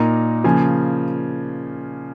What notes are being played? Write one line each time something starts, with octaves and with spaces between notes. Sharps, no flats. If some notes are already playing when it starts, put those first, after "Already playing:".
Already playing: A#2 A#3 D#4 A#5
C#3 F3 A#3 G#5